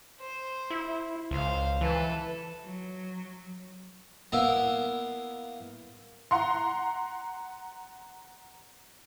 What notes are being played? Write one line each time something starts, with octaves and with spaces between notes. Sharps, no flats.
C5
E4
C#2 C5 F5
E3 A4 B4
F#3
A#3 B3 E4
F#5 A#5 C6